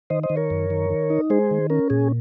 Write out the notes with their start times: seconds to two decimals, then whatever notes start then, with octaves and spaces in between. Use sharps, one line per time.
0.10 D#3 C5 D#5
0.23 C5 D#5
0.30 D#3
0.36 A#4 C#5
0.50 F#2
0.70 D#3
0.90 D#3
1.10 D#4
1.30 G#3 G#4 C5
1.51 D#3
1.70 C#4 A#4
1.90 A#2 G#4